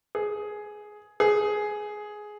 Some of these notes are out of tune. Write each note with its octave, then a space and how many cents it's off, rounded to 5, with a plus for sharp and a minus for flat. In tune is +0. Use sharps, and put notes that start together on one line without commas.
G#4 +10
G#4 +10